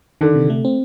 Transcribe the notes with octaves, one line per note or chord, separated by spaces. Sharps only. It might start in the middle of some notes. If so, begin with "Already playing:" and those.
D3 D#3
C3
A3
C4